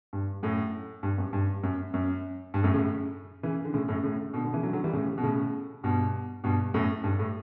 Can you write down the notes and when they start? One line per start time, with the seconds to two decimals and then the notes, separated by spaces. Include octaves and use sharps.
0.13 G2
0.43 F#2 A2
1.03 G2
1.18 F#2
1.33 G2
1.63 F#2
1.94 F#2
2.54 G2
2.63 F#2 A2
2.74 A2 C#3
3.43 C#3 E3
3.65 D3
3.73 A2 C#3
3.88 F#2 A2
4.03 A2 C#3
4.33 B2 D3
4.44 B2 D3
4.53 C#3 E3
4.63 D3 F#3
4.73 D3 F#3
4.84 E3 G3
4.93 A2 C#3
5.17 B2
5.23 A2 C#3
5.84 G2 B2
6.44 G2 B2
6.74 F#2 A2
7.04 G2
7.19 A2